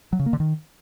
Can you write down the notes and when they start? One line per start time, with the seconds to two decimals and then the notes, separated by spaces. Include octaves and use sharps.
0.13 F#3
0.19 C#3
0.26 A#3
0.33 D3
0.40 D#3